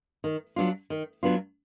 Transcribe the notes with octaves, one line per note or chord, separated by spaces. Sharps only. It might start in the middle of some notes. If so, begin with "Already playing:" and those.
D#3
F#3 B3 D4 F4
D#3
F#3 B3 D4 F4